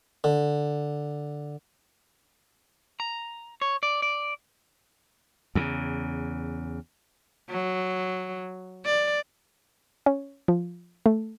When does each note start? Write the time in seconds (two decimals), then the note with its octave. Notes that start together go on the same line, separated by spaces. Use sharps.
0.24 D3
3.00 A#5
3.61 C#5
3.83 D5
4.02 D5
5.55 E2 C#3
7.49 F#3
8.85 D5
10.06 C#4
10.48 F3
11.06 A3